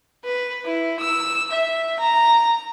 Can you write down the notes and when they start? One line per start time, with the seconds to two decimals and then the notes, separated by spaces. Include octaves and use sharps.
0.24 B4
0.65 E4
1.00 E6
1.51 E5
2.00 A#5